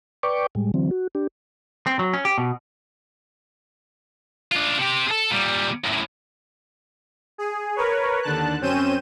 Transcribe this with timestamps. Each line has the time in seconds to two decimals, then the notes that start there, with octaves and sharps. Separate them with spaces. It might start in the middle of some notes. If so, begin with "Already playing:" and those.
0.23 B4 D5 G5 C#6 D6
0.55 A2 G3 G#3
0.74 D3 E3 F#3 C4
0.91 F#4
1.15 D4 G4
1.87 C4
1.99 F#3
2.14 C#4
2.25 G4
2.38 B2
4.52 D4 F4
4.78 C3 G4
5.08 G#4 A4
5.31 A#2 G3
5.84 F#2 A2
7.38 G#4
7.76 A#4 B4 C#5
8.22 D#2 D3 A5 F#6
8.61 F#2 C4 C#4 G6 D#7 E7